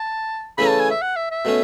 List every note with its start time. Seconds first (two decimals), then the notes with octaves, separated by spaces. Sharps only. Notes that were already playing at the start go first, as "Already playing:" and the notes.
Already playing: A5
0.58 C#3 E3 A3 C#4 E4 B5
0.69 A5
0.80 G#5
0.91 E5
1.02 F#5
1.16 E5
1.31 E5
1.45 B2 A3 C#4